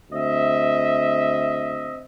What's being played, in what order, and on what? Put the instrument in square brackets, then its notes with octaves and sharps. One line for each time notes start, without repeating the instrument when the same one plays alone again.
[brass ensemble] D2 C4 D#5 E5